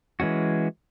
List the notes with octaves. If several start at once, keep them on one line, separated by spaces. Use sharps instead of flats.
E3 G#3 C#4 F#4